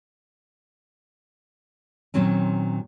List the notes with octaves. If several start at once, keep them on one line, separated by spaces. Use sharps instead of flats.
A#2 D#3 F#3 C4 C#4